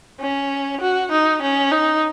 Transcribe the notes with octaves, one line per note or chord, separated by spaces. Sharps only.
C#4
F#4
D#4
C#4
D#4